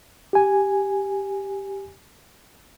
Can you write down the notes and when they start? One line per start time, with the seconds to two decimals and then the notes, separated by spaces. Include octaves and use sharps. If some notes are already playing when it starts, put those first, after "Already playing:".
0.33 G4 G#5